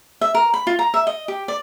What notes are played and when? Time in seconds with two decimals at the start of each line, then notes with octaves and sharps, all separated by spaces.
0.21 E5
0.34 A#4
0.54 B5
0.67 F4
0.79 A#5
0.94 E5
1.07 D#5
1.28 G4
1.48 D5